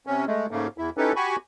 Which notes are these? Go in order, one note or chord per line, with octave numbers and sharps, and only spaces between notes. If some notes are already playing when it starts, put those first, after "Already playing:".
C3 C#4
G#3 A3
G#2 C#3 A3 A#3
E2 E4
C#4 D#4 E4 G4 A4 B4
F#4 G4 G#5 B5 C#6